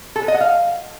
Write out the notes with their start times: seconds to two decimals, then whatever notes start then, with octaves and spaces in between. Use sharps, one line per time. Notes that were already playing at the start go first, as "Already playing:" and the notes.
0.16 A4
0.22 B4
0.28 D#5
0.34 F#5
0.41 F5